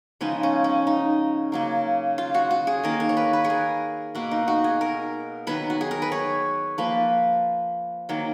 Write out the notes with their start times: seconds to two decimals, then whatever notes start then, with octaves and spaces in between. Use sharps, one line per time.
0.21 C#3 F3 G#3 B3 D#4
0.43 C#4
0.64 C#4
0.87 D#4
1.52 C#3 F#3 A#3
2.18 F4
2.34 F#4
2.51 F#4
2.67 G#4
2.84 D#3 A#3 A#4
3.00 A#4
3.09 C#5
3.17 B4
3.33 B4
3.44 G#4
3.50 A#4
4.15 B2 A#3 F#4
4.31 D#4
4.48 F#4
4.64 G#4
4.81 A#4
5.47 D#3 F#3 B3 B4
5.70 F#4
5.81 G#4
5.91 A#4
6.02 B4
6.12 C#5
6.78 F3 A#3 B4
8.09 D#3 F#3 A#3